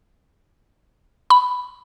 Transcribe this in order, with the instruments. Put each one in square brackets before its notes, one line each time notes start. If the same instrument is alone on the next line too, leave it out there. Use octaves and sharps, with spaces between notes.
[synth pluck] B5